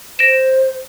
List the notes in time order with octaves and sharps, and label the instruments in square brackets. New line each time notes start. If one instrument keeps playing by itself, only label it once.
[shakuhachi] C5 [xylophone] A#6 D7 E7